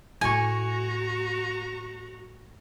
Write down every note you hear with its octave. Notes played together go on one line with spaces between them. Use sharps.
A2 A3 F#4 G#5 A#5 C#6